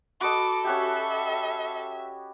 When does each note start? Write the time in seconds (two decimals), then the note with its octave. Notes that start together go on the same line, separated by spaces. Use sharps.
0.21 F#4 A4 B4 D#5 D6
0.65 C#4 F#4 G4 E5